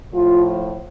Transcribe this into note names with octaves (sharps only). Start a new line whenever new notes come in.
A2 F3 F4